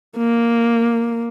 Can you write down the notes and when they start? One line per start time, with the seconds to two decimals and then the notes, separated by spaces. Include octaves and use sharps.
0.18 A#3